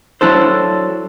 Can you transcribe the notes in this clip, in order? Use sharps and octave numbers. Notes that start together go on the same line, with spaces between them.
F#3 D4 E4 A4 C5